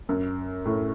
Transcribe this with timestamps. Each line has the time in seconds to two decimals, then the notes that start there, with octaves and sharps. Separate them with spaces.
0.09 F#2
0.65 A2